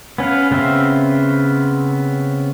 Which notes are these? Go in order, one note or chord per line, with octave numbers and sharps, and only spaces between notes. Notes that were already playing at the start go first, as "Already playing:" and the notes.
B3 C#4 B4 F5
C#3 B3 C4 E5 F5